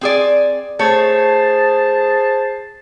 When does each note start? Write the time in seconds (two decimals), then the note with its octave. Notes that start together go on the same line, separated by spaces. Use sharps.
0.01 C4 G#4 D5
0.79 A3 G#4 C5 C#5 A5